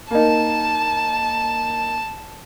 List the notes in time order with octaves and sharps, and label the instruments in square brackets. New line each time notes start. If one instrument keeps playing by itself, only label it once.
[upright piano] A#3 D#4 [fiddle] A5